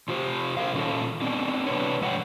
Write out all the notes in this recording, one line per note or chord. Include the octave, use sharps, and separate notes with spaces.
C3 F4 G4 C5
A#4 C5 F5
A#2 D#3 C#4 F4 A4
B3 C4 D4
C3 D4 B4 C#5
G#2 F3 C#5 E5 F#5 G5